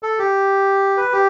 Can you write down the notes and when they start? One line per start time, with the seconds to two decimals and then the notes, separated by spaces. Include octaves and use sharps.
0.03 A4
0.19 G4
0.97 B4
1.13 G4